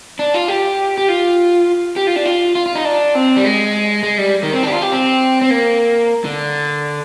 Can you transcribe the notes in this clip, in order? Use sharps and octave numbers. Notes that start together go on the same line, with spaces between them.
D4
F4
G4
G4
F4
G4
F4
D4
F4
F4
F4
D#4
D4
C4
G3
G#3
G#3
G3
D#3
C4
D4 G4
F4
G4
C4
C4
A#3
D3